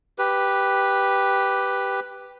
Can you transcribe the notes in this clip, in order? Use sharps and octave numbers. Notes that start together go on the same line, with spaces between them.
G4 B4